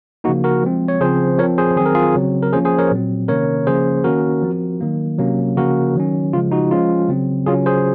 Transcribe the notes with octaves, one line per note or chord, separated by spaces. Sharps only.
C#3 F3 A#3 D#4 F#4
F#4 A#4
F3 G#3 C4
C#5
C#3 F3 C4 G#4 C5
F3 C4 A#4 C#5
G#4 C5
D#3 F#3 C4 G#4
A#4
F4 G#4
C#3 F#3 C4
A#4
F3 A#3 C#4 G#4 C5
G#4 C5
A#4 C#5
A#2 F#3 C4
C3 D#3 A#3 C#4 A#4 C#5
C#3 F3 A#3 C#4 G#4 C5
D#3 A#3 C#4 F#4 A#4
F3 C4
D#3 F#3 A#3
C3 F#3 A#3 C#4
C#3 F3 A#3 C#4 F#4 A#4
D#3 F#3 C#4
C#3 F3 G#3 F4
D#4 F#4
F3 G#3 C#4 F4
C#3 F#3 C4
C#3 F#3 C#4 F4 G#4
G#4 C5